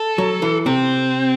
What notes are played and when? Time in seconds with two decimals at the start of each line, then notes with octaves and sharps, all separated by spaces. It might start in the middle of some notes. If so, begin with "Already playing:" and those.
Already playing: A4
0.18 F#3
0.42 E3
0.66 C3 C4